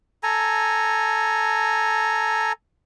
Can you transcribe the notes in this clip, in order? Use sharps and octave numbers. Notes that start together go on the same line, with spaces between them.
A4 G#5 A#5